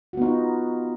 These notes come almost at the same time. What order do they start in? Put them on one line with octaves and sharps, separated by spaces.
F#4 B3 D#4 F4